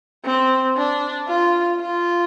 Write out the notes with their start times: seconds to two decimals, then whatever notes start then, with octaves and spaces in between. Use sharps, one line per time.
0.25 C4
0.77 D4
1.28 F4
1.80 F4